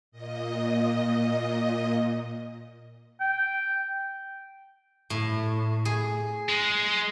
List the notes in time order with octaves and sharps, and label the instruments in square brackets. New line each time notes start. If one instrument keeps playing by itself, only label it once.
[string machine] A#2 D#5
[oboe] G5
[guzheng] A2
G#4
[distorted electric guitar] G#3